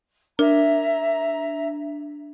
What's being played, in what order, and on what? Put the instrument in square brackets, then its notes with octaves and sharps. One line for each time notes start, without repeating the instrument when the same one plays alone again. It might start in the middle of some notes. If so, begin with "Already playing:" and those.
[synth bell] D4 [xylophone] A#4 [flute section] E5 A#5